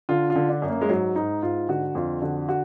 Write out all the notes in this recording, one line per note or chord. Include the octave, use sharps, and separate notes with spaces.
D3 F4
F4
D3
D4
F#2
A#3
G#3
G#2 F#3
G#2 D#4
G#2 F4
D3 F#4
F2 F4
D3 F#4
F#4